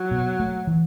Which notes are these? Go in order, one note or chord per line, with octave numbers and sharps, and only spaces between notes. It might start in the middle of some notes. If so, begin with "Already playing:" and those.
Already playing: F#3
B2
A3
E3